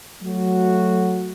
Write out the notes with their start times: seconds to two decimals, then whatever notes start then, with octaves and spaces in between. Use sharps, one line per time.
0.23 F#3 A3 F#4